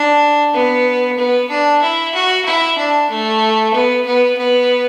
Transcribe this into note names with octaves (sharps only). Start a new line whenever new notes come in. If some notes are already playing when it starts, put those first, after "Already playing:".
Already playing: D4
B3
B3
D4
E4
F#4
E4
D4
A3
B3
B3
B3